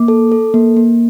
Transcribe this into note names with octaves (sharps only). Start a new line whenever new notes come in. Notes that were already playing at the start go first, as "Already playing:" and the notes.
Already playing: A#3 D6
A4
A4
A#3
A#3